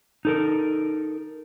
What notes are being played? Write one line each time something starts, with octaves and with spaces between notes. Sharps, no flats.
D#4 A4 A#4